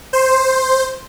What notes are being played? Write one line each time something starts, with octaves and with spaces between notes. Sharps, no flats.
C5